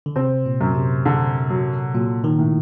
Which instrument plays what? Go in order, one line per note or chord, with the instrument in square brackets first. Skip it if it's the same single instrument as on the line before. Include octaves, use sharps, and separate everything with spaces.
[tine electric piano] D3
[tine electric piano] C3 [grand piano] C4
[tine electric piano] A#2
[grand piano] F#2
[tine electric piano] C3
[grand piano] D3
F#3
[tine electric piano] A#2 [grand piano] F#3
[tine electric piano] D#3
[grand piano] A2